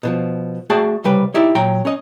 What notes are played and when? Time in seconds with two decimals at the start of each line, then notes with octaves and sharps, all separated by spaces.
0.03 B2 D#3 F3
0.70 A3 F#4 G#4 D5 G5 A5
1.04 C2 C#3 G3 B4 G5
1.34 D#4 E4 G4 D5
1.55 A#2 F#3 G5 A#5
1.85 C#4 D#5